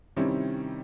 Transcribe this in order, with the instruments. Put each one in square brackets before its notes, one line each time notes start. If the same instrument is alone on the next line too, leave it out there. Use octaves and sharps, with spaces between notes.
[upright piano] C3 D#3 G3 C4 C#4 E4